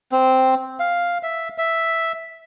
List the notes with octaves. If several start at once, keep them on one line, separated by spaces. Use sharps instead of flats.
C4
F5
E5
E5